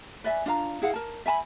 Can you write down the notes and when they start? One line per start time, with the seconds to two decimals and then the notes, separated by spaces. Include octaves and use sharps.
0.24 B4 D5 E5 G#5
0.46 D4 F4 F5 A#5
0.82 E4 G#4 F5 F#5
0.93 A#4 A5
1.26 E5 G#5 A5 B5